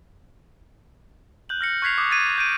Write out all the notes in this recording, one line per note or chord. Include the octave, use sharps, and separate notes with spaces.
F#6 G6 F#7
F6 A#6 C#7
C#6 F#6 G#6 B6 C7 F7
D6 D#6
G#6 A6 C7 C#7 D#7
G6 A#6 D7 D#7